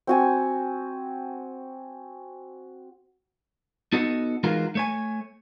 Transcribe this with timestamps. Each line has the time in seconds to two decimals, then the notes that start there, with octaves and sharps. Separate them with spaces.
0.07 C4 F#4 G#5
3.93 B3 D#4 F#4 A4 D#5 F#5
4.43 E3 G#3 D#4 F4 F#4 A#4
4.75 A3 C#5 G#5